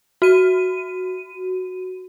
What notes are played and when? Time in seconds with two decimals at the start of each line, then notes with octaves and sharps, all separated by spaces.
0.22 F#4 D#7